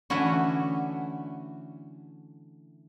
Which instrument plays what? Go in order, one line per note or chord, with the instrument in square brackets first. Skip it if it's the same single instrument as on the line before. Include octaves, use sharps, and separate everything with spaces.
[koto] D3 E3 A3 C#4 E4 F#4